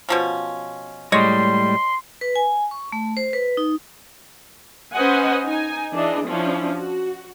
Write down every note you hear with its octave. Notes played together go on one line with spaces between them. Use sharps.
B2 F3 C#4
A2 G3 G#3 C#5 D#5 C6
B4
G#5
C#6
A3
C5
B4
D#4
C#4 B4 C5 D#5 F#5 G#5
D#4 G#5
E3 D4 G#4 D#5
F3 C#4 D4 E4
F#4